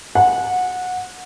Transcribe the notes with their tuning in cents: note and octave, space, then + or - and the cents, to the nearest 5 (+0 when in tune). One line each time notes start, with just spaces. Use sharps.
F#5 -20